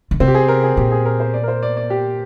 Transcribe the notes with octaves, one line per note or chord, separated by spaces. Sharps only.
D3
C3 C4
G4
G#4
A#4
G#4
A#2 G4
G#4
A#4
C5
D5
A#4
C5
D5
D5
G4